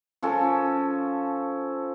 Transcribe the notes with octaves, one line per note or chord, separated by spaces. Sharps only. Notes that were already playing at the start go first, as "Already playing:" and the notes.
F3 C#4 A4